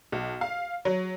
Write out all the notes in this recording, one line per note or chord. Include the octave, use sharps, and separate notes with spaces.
B1
F5
F#3